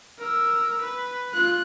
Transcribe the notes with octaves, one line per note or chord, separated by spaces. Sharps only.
A#4 E6
B4
F4 F#6